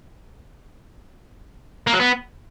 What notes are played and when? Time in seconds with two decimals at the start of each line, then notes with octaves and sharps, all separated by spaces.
1.87 A#3
1.93 F#3
2.00 B3